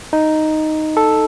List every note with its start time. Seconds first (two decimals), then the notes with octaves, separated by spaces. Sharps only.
0.13 D#4
0.97 A4